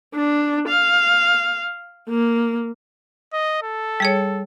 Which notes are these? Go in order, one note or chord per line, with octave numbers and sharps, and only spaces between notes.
D4
F5
A#3
D#5
A4
G3 G#4 C#5